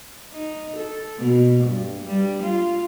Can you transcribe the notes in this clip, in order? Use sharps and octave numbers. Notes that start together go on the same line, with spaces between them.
D#4
A4
B2
G2
G3
F4